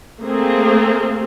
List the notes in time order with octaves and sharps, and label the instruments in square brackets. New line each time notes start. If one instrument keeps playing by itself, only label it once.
[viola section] A3 A#3 C4 G#4